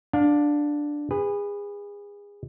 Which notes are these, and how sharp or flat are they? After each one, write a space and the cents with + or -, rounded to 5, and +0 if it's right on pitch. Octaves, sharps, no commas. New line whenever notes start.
D4 +0 F5 +30
G#4 -30 B4 +0